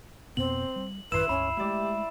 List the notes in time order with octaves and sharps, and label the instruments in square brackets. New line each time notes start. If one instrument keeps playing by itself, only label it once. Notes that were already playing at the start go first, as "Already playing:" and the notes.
[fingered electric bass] F2 B2 B3 [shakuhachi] C4 [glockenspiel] F#7
[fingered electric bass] G3
[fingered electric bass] A1 F#2 D#3 [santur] E4 C6 [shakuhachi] B4 [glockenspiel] E6 E7
[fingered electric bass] C#2 G2 [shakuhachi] C#4 [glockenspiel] B5
[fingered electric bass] G#3 A3 [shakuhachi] G4 [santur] D5 E5